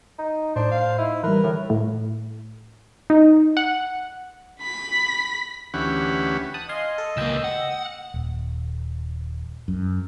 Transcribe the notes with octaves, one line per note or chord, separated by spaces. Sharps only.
D#4
A2 D4 C5
F5
D#4 E4
E3 G3 A#4 B4
A2 D3 E3
A2
D#4
F#5
B5 B6
D2 E3 C#4 G4 F#5 B5
A5 D#6 F#6
D#5 F5 G#5 C6
A4
C#2 A#3 G5 E6
F#5
D#1
F#2